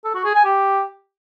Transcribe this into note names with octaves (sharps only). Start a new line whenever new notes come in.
A4
F#4
G#4
G#5
G4